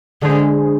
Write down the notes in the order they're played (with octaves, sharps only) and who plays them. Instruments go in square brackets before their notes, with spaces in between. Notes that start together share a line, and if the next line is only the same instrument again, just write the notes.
[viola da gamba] D3 [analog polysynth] G#3 D4 G#4 C5